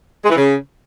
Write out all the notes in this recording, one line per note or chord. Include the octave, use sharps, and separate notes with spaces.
G#3
E3
C#3